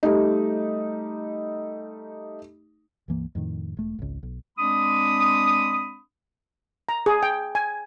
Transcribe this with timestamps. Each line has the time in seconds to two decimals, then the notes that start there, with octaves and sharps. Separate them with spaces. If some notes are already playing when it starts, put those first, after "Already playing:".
0.03 G3 A3 D#4
3.08 C#2 G2 E3 A#3
3.35 F2 A2 D#3
3.77 E1 A3
3.99 G#1 C#2
4.23 B1
4.58 G#3 C4 D4 B5 D#6
6.89 A#5
7.06 G#4
7.23 G5
7.55 G#5